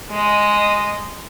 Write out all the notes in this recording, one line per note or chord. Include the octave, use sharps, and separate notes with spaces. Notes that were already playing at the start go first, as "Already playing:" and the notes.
G#3 D#5